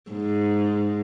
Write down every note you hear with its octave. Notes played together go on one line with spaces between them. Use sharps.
G#2